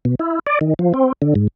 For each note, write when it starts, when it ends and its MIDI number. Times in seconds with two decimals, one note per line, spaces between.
0.05 0.15 47
0.19 0.39 64
0.47 0.59 74
0.61 0.74 51
0.79 0.93 53
0.94 1.12 60
1.22 1.34 50
1.35 1.48 44